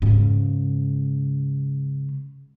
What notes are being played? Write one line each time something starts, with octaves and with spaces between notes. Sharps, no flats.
G#2 C#3